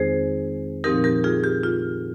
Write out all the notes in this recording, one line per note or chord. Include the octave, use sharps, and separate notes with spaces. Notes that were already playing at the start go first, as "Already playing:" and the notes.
Already playing: F2 D#3 G#3 C4 D#4 G#4 C5
A#2 F3 C4 D#4 G4 A#4
G4 A#4
F4 G#4
G4
F4